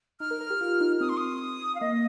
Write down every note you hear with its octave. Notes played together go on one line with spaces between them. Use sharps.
D#4 F6
A#4
A#4
G4
F4
D#4
C4 D#6
C6
D#6
F5
A#3 D#5